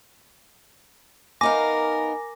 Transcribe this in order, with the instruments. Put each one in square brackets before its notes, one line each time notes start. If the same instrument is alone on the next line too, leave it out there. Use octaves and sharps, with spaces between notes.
[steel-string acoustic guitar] B3 D#4 F5 [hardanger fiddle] A#4 [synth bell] G#5 D6 A#6